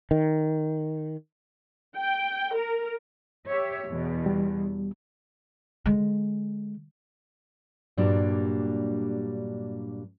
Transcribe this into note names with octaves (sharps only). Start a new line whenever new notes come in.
D#3
G5
A#4
G4 C#5 E5
E2 B2
G3
D3 G#3
G2 A#2 F#3 G3 A#3 D4